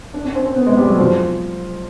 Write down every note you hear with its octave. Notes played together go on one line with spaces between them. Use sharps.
D4
C#4
C4
C4
B3
G#3
G3
F#3
F3